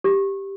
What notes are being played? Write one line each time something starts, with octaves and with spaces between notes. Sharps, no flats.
G4